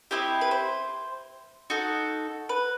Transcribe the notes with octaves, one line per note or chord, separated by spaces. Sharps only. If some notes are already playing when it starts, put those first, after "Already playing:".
C4 E4 G4 D#5
B4
C5
D#4 F#4 A4
B4